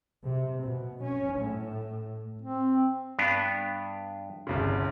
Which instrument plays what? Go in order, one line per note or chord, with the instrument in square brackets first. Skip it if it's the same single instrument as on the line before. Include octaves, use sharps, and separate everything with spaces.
[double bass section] C3
B2
C#4
A2
[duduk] C4
[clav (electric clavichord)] G2 B3 D4
[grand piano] G1 C2 C#3